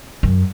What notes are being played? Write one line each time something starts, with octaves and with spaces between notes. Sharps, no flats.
F#2